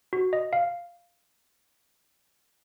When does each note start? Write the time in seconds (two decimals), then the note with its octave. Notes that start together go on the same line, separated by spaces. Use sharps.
0.13 F#4
0.33 D#5
0.53 F5